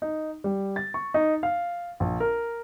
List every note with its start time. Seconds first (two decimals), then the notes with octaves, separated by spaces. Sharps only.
0.02 D#4
0.44 G3
0.76 A6
0.94 C#6
1.14 D#4
1.43 F5
2.00 A#1
2.20 A#4